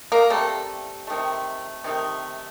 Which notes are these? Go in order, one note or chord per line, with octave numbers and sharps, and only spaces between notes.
A#3 A#4
C3 G3 A3 A4
C3 D#3 A3
C3 D#3 A3